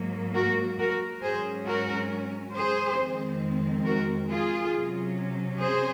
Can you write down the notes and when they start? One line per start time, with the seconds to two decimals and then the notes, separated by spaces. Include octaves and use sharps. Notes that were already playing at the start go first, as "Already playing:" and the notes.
Already playing: G#2 F#3 A#3
0.35 F#4 A#4
0.78 F#4 A#4
1.22 G#2 F#3 C#4 G#4 C5
1.66 F#4 A#4
2.54 G#4 C5
2.98 F2 D#3 G#3 C4
3.85 F#4 A#4
4.29 F4 G#4
4.72 C3 F#3 C#4
5.60 G#4 C5